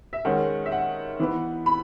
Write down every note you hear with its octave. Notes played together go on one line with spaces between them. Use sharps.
E5
D#3 G#3 C#4 F#5
E5
F#5
E3 B3
B5